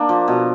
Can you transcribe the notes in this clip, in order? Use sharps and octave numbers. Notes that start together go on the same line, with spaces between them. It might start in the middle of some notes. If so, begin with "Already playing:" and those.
Already playing: A#3 D4
F3
B2